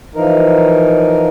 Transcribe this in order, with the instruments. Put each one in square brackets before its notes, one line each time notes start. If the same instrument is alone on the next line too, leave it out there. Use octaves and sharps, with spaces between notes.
[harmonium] E3 F3 D#4 A#4